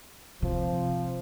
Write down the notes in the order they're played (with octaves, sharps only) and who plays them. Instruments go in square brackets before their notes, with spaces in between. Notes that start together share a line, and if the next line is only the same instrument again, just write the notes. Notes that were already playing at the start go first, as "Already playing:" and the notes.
[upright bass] C3 [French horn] F3